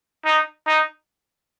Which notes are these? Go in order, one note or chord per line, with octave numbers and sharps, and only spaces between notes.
D#4
D#4